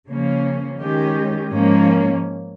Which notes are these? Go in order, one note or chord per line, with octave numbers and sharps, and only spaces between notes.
C#3 F3 A#3 C#4
D#3 G#3 C#4 G4
G#2 F3 A#3 C#4